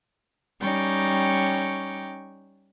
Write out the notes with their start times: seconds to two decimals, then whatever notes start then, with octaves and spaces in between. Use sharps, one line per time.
0.61 G3 C#4 D#4 G5 C#6 D6